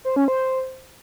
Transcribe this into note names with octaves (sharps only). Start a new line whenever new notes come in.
C5
C#4
C5